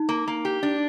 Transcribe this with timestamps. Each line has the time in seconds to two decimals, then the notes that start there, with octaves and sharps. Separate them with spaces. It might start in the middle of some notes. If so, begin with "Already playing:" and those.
Already playing: D#4
0.09 A#3
0.28 A#3
0.45 G4
0.63 D4